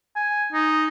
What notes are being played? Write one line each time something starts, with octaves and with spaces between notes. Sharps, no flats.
G#5
D#4